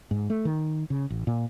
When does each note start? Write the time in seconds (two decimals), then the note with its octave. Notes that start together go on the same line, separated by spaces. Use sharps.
0.11 G#2
0.30 A3
0.45 D#3
0.90 C#3
1.10 A1
1.27 A#2